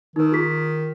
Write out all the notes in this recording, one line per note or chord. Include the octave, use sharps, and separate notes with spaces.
D#3 D#4 A#4
F4 G#4 B6